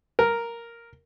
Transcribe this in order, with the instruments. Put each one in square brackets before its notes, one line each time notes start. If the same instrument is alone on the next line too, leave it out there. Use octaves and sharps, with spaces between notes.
[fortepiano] A#4